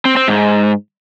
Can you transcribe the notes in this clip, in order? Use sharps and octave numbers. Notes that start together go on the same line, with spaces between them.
C4
C4
G#2